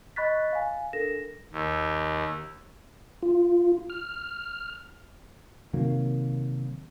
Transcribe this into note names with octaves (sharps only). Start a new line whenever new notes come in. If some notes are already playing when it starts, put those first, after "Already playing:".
D#5 B5 C#6 F#6 A6 B6
F5 G#5
D4 A4 A#4 A#6 E7
D#2
F4
F6
C3 D#3 F#3 A#3